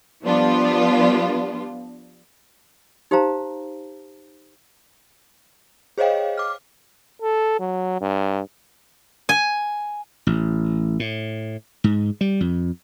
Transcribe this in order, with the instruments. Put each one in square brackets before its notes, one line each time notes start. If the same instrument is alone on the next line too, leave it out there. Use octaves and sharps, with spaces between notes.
[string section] F3 G3 B3 D4 F4
[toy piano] D#4 G4 C5 F5 A5 A#5
[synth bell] G#4 C5 C#5 D#5 F5 G5
D6 F6
[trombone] A4
F#3
G2
[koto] G#5
[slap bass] A1
A2
G#2
G3
F2